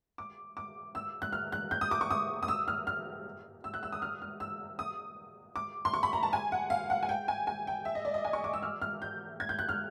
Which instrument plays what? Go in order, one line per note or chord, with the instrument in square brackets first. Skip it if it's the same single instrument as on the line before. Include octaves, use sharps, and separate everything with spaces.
[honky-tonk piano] D6
D6
E6
F#6
F6
F#6
G6
D#6
D6
C#6
D#6
D#6
E6
F6
F6
E6
F#6
E6
D#6
F6
F6
E6
D#6
D6
C6
C#6
B5
A#5
A5
G#5
F#5
F5
F#5
G#5
G5
G#5
G#5
G5
E5
D#5
D5
D#5
G#5
C#6
D6
E6
F6
F6
G6
G#6
G6
F#6
F6